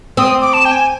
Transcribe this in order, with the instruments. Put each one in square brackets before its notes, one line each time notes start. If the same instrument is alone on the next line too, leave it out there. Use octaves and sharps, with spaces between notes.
[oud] C4 [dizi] D#6
[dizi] D6
A5
G5
G#5